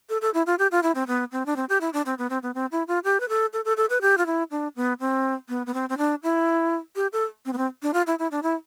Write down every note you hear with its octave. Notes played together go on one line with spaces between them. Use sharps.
A4
A4
E4
F4
G4
F4
E4
C4
B3
C4
D4
C4
G4
E4
D4
C4
B3
C4
B3
C4
E4
F4
G4
B4
A4
A4
A4
A4
B4
G4
F4
E4
D4
B3
C4
B3
B3
C4
C4
D4
E4
G4
A4
C4
B3
C4
D4
F4
E4
E4
D4
E4